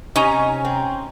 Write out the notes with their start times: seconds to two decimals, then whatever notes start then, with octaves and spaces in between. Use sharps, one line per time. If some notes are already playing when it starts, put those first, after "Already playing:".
0.16 C3 C#4 D#4 G#5 A#5
0.65 C4